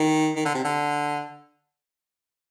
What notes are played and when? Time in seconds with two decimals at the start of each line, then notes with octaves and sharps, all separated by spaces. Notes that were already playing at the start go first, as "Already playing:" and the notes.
Already playing: D#3
0.36 D#3
0.45 D3
0.54 C3
0.64 D3